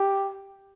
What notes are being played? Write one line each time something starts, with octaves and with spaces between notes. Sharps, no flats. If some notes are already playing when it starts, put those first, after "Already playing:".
Already playing: G4